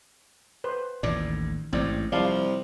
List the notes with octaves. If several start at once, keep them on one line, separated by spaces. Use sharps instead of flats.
B4 C5
A1 D#2 A2 D5
A1 G#2 C4 D5
C2 F3 D5 F5 A5